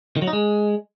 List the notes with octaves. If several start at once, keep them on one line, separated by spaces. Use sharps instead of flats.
D#3
F#3
D#4
G#3